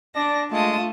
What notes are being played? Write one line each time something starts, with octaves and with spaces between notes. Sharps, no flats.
D4 D5 A5 A#6
G#3 A3 F4 A5 D#6